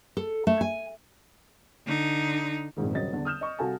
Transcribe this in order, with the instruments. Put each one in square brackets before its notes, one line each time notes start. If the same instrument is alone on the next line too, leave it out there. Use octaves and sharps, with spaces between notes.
[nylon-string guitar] A4
A3
G#5
[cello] D3 D#4
[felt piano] A#1 F2 G#2 D#3
D#1 C#3 F#3 D#5 A6
E2 D3
D#6 F6 G6 E7
D#5 C#6
C2 F#4 A4 F5 G#5 A5